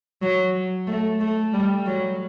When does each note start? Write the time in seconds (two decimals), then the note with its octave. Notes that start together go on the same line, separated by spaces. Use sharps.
0.22 F#3
0.88 A3
1.20 A3
1.53 G3
1.86 F#3